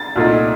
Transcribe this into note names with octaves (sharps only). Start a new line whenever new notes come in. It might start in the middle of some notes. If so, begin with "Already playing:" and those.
Already playing: A6
C2 A#2 A3 D#4